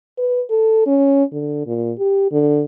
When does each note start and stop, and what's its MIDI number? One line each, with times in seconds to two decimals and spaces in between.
0.18 0.42 71
0.50 0.82 69
0.86 1.23 61
1.32 1.66 50
1.66 1.92 46
1.99 2.29 67
2.31 2.64 50